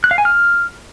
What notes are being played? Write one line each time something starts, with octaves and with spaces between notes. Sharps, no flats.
F#6
F5
G#5
F6